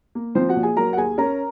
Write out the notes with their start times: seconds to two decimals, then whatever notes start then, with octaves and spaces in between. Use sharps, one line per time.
0.15 A#3
0.35 F3 C4 C5
0.49 F#4 F#5
0.56 A#2
0.63 G#4 G#5
0.77 F#3 A#4 A#5
0.93 F#5
0.97 D#2 G#4 G#5
1.18 C#4 A#4 A#5